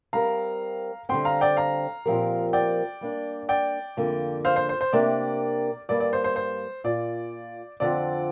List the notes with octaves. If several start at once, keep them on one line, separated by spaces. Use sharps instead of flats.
G3 C4 G4 A#4 F5 A#5
D3 G3 C4 G5 C6
F5 A#5
D5 G5
F5 A#5
A#2 F3 C4 G4 A#4
D5 G5
G3 A#3 D4
D5 G5
F2 D3 A#3
C5 F5
C5
C5
C5
C3 A#3 D4 G4 A#4 D5
G2 G3 A#3 D5
D5
C5
C5
C5
A#2 A#3 F4 D5
F2 D3 F3 C4 D5